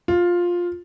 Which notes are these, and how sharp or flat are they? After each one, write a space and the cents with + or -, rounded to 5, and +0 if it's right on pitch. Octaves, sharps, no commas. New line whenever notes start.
F4 +10